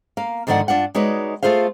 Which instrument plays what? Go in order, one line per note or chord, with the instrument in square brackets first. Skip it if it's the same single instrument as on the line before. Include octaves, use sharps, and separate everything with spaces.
[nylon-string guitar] A#3 F5
G#2 D3 D#3 F3 D5 F#5
G2 D4 F4 F#5
G#3 D#4 F#4 B4 C#5 D5
A3 F4 G#4 C5 F5